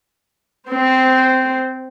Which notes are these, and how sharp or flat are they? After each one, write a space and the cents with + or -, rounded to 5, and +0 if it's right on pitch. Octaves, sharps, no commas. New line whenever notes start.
C4 -15 C5 +0